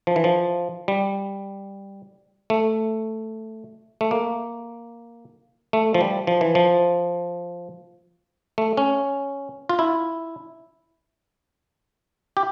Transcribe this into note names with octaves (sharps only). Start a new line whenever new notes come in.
F3
E3
F3
G3
A3
A3
A#3
A3
F3
G3
F3
E3
F3
A3
C#4
F4
E4
G4